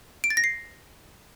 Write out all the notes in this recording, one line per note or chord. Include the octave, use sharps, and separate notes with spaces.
D7
A6
A#6
C7